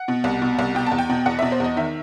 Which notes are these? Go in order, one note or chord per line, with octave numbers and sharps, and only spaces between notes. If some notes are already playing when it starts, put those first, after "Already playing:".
Already playing: F#5
B2
C2
B2
C2
B2 G5
A5
E2
G5
B2
E2 F#5
B2 E5
C5
E2 D#5
D#3 E5